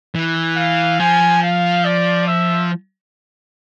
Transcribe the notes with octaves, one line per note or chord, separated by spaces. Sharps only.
E3
F5
F3 G#5
F5
D5
E5